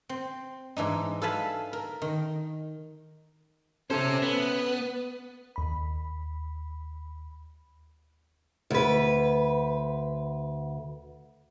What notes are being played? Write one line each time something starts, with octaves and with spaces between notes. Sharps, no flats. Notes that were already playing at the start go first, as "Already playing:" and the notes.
C4
G#2 E3 D4 D#4
A4 B4 F5 G#5 A5 B5
A#4
D#3
C#4 A4 C5 E5
B3
D#2 B5
D2 B4